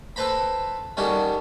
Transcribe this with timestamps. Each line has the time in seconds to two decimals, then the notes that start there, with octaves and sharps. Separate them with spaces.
0.16 A4 B4 C5 A#5 B5
0.97 D#3 G3 C#4 F#4 A4